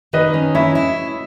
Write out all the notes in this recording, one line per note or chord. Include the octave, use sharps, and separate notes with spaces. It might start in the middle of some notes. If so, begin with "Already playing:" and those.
D#3 B4 D#5
C#4
E4 C#5 E5
E4